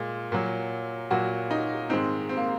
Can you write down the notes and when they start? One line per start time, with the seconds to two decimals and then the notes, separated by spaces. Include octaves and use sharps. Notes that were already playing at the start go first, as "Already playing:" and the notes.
Already playing: A#2 G#3
0.32 A#2 F#3
1.11 A#2 F#3 F#4
1.51 D#4
1.89 G#2 D#3 G#3 C4
2.29 C4
2.37 A#3